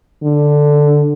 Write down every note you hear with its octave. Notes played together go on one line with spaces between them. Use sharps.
D3